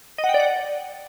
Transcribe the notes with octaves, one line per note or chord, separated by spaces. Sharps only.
D#5
F#5
G5
D5
F#5